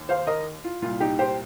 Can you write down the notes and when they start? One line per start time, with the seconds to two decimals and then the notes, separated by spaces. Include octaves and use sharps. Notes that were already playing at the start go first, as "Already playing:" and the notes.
Already playing: D#2
0.09 C5 F5
0.27 A#4 D#5
0.64 F4
0.82 C2 A#2 F4
1.00 D#4 G4
1.19 G4 C5